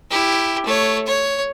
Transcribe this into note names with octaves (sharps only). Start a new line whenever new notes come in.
E4 G4
A3 C#5
C#5